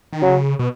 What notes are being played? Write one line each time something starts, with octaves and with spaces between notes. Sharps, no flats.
D#3
C#3 F#3
B2